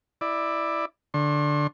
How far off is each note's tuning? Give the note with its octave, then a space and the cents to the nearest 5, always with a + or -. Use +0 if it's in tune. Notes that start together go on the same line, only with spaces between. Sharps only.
E4 +0 D5 +15
D3 +0 C6 +45